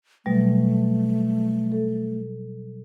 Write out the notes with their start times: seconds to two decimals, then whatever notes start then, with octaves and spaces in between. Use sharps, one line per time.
0.26 B2 F#3 G3 A3
1.72 A4